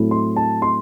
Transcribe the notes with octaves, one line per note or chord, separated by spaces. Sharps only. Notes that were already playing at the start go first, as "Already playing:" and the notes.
Already playing: A2 F#3 A3 C4 E4
C6
A5
C6